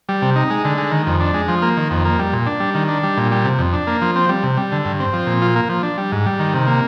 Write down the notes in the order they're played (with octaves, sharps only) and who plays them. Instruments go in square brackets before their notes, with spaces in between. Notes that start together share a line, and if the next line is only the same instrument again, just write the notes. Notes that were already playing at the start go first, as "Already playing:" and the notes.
[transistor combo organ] G3
C3
D#4
G#3
D3
G#3
D#3
F2
D4
G#3
F3
A#3
D#3
F2
A#3
G3
A#2
D4
G3
D#3
D4
G3
A#2
G3
C3
F2
D4
A#3
F3
C4
G3
C3
G3
D3
G2
C4
F3
A#2
F4
A#3
F3
D4
G3
G#2
G3
D#3
C3
A#3